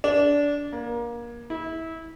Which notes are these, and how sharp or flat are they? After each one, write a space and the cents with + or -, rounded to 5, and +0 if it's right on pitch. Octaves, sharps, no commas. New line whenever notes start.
D4 -20
A#3 +25
E4 -25